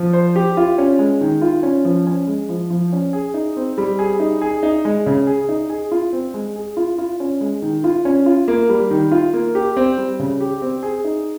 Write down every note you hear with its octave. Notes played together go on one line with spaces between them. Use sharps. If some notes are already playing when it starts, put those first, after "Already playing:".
Already playing: F3
C5
G4
F4
C#4
G#3
D#3
F4
C#4
F3
C#4
G#3
F3
F3
C#4
G#4
D#4
C4
G3
G#4
D#4
G#4
D#4
G#3
C#3
G#4
D#4
G#4
F4
C4
G#3
G#4
F4
F4
C#4
G#3
D#3
F4
C#4
F4
A#3
G3
D#3
F4
A#3
G4
C4
G3
C#3
G4
C4
G#4
D#4